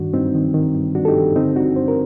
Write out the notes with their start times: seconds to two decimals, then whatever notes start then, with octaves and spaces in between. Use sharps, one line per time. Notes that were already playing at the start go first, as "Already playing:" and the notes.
Already playing: G2 D#3 D4 F#4
0.14 G2 C4 D#4
0.35 D#3
0.54 D#3
0.75 G2
0.95 G2 D4 F#4
1.05 A4
1.08 D#4 G4
1.15 D#3
1.35 D3 C4 D#4
1.56 G2 D4 F#4
1.76 G2 C5
1.88 A#4